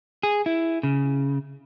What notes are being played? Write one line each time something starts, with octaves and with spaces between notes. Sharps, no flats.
G#4
E4
C#3